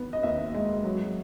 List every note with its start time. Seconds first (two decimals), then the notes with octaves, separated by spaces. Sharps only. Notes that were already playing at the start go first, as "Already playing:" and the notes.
Already playing: D#3 B3
0.13 D#5
0.23 D#2 E5
0.54 G#3
0.84 F#3